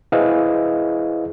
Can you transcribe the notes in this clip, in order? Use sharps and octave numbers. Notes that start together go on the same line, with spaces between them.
E4 G#4 B4 C5 D#5 F5